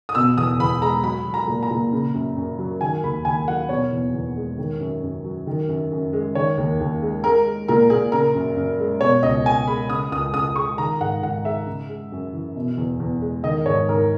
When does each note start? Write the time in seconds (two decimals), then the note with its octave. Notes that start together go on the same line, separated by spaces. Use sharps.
0.09 D#6
0.15 B2 E6
0.37 E2 D#6
0.59 E2 B5
0.81 G#3 A#5
1.03 F#3 B5
1.26 F#3
1.34 A#5
1.48 A#2
1.63 A#5
1.71 A#2
1.92 C#3
2.14 F#2
2.37 F#2
2.59 F#3
2.81 D#3 G#5
3.03 D#2 B5
3.25 D#2 G#5
3.48 F#3 F#5
3.69 B2 C#5
3.91 E2
4.14 E2
4.37 G#3
4.58 D#3
4.80 F#2
5.03 F#2
5.25 F#3
5.47 D#3
5.68 F#2
5.91 F#2
6.13 G#3
6.35 D#3 C#5
6.58 D#2
6.80 D#2
7.02 G#3
7.24 G#3 A#4
7.46 G#3
7.68 A#2 A#4
7.90 A#2 G#4
8.12 C#3 A#4
8.35 F#2
8.56 F#2
8.80 G#3
9.01 B2 C#5
9.23 C#2 D#5
9.46 C#2 G#5
9.67 G#3 B5
9.90 C#3 D#6
10.11 C#2 D#6
10.34 C#2 D#6
10.56 G#3 C#6
10.78 D#3 A#5
11.00 G#2 F#5
11.23 G#2 F#5
11.45 G#3 E5
11.66 C#3
11.89 G#3
12.12 F#2
12.33 E3
12.56 B2
12.77 E2
13.00 E2
13.21 G#3
13.44 D#3 D#5
13.66 G#2 C#5
13.89 G#2 A#4